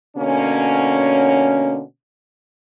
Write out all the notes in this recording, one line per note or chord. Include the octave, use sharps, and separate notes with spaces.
B2 D3 A#3 C#4